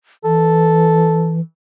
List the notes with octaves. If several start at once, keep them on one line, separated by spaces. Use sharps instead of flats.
E3 A4